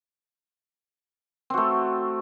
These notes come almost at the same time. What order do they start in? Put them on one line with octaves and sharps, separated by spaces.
C4 F#4 A3